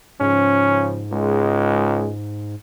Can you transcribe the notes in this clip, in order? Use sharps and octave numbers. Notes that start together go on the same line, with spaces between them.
G#2 C#3 F3 C#4
C#2 G#3